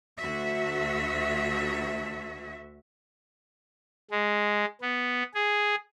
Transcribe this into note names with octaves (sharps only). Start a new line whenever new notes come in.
D2 F#4 E5
G#3
B3
G#4